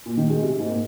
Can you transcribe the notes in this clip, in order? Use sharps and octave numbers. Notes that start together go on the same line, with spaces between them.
A#2
D#3
G#3
C3
G#2
A#3